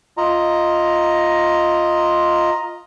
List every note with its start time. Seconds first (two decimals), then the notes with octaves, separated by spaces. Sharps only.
0.17 F4 D#5 A#5